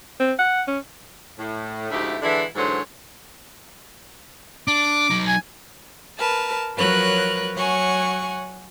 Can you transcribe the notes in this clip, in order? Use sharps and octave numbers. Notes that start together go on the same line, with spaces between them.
C4
F#5
C#4
A2
D2 G#2 F3 A3 E4 G4
D3 E3 G#3 D4 E4
G#2 D3 E3 F#3 C5 C#5
D4 D6
F#3 D#4
G#5
A#4 B4 A5
F3 F#3 A#4 B4 C#5 F#6
F#3 C#5 F#5 G#5 C#6